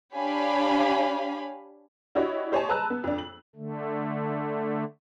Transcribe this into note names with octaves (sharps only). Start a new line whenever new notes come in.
D4 G4 C#5 F5 G#5 B5
D4 E4 F#4 G4 C#5 D#5
G4 C5 C#5 D#5 G#5 A5
B4 A5 A#5 E6 F#6
B3
F2 D4
F#7
D3 A3